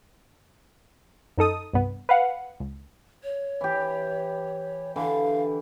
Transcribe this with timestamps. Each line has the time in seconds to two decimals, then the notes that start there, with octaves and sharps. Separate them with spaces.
1.38 F#2 D#4 A4 D#6
1.73 C2 G2 B3
2.09 B4 F5 F#5
2.60 C#2
3.24 C#5
3.61 E3 G4
4.96 D3 E3 F5